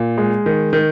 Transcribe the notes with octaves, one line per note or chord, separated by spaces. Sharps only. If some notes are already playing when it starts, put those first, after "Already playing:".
Already playing: A#2
G#3
D#3
D#3